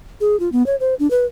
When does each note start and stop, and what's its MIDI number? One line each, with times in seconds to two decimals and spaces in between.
0.21 0.39 68
0.40 0.49 65
0.52 0.66 59
0.66 0.76 73
0.80 0.95 72
0.99 1.10 62
1.11 1.25 71